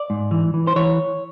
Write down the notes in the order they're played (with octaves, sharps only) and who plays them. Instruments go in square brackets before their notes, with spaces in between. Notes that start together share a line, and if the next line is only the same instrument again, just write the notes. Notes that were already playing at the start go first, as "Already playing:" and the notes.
Already playing: [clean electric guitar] D5
G#2
E3
E3
C5
E3 C#5